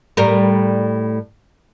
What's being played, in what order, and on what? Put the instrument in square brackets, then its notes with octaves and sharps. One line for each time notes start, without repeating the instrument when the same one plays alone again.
[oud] A2 G3 A#4